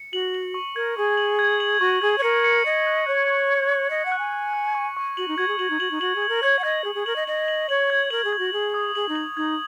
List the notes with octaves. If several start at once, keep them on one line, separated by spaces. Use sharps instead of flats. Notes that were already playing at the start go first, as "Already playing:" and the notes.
Already playing: C#7
F#4 F#7
F#7
C#6
A#4 G#6
G#4 C#6
F#7
G#6
F#7
F#4 C#6
G#4 G#6
C#5
A#4 C#7
C#7
D#5 C#7
F#6
C#5 F#6
C#6
C#6
C#6
D#5 C#7
F#5
F#6
G#5
F#6
F#6
C#6
C#6
F#4 F#7
D#4
F#4 G#6
G#4
F#4 F#7
D#4
F#4 F#7
D#4
F#4 F#7
G#4
G#6
A#4
C#5 G#6
F#5
D#5 G#6
G#4 G#6
G#4
A#4 F#7
D#5
D#5 F#7
F#7
C#5 F#7
G#6
A#4 F#7
G#4
G#6
F#4
G#4 G#6
D#6
G#4 F#7
D#4
F#7
D#4 G#6